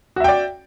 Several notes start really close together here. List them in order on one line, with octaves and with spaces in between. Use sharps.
F#4 E5 G5 D5